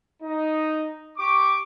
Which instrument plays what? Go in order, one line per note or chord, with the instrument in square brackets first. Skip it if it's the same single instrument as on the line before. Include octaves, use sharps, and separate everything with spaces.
[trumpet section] D#4
G4 C#6 D6